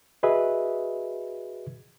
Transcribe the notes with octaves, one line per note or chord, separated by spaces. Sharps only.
F#4 G#4 B4 D#5 E5